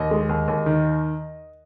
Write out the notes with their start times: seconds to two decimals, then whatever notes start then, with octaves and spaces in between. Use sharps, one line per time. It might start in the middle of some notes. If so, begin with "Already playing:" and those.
Already playing: D#2 D#5
0.11 G#3
0.29 D#2
0.48 D#2
0.66 D#3